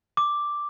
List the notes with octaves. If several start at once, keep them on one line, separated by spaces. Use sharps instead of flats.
D6